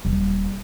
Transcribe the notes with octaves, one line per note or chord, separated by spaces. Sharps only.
D#1